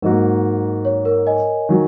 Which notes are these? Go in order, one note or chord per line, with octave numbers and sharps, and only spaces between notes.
G#2 F#3 A#3 F#4 A#4 D#5
C#5
A#4
D#5 G#5
D#3 F#3